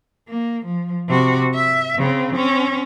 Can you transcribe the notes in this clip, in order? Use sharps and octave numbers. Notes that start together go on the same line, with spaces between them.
A#3
F3
C3 F#4
E5
C#3 C4
C4 C#4